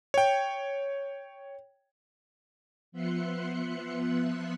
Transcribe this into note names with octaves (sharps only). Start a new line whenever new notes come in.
C#5 G5
F3 B3 E5 C6 F#6 C#7